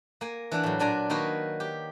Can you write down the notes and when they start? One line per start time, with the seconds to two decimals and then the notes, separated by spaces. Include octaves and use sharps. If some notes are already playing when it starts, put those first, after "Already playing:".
0.21 A#3 G#5
0.51 E3 D4 F#5
0.63 A2 F#3
0.79 A#2 D4 G#5 A#5
1.10 D#3 A#3 F#4 A#4 B4 C#5
1.60 G4